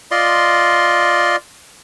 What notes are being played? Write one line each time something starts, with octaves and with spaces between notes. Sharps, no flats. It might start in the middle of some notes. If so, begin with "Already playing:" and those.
F4 D5 D#5 C6